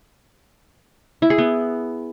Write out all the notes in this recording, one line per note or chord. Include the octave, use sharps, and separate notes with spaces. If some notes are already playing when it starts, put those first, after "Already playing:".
E4
G#4
B3